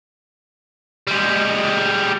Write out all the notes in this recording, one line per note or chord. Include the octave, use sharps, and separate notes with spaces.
G3 G#3